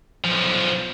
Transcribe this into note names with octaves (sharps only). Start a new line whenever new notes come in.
B1 F3